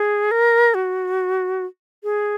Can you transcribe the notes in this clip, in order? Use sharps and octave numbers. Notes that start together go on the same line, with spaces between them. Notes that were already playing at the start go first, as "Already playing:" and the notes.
Already playing: G#4
A#4
F#4
G#4